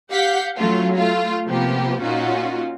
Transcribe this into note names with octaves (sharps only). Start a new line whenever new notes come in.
G4 F5 F#5 G6 B6
F#3 A3 C#4 F4
A3 F4
C3 F3 A#3 B3 G4
A#2 C#4 D#4 F4 F#4